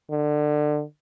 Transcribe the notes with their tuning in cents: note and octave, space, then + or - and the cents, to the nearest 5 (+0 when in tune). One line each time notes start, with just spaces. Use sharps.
D3 +25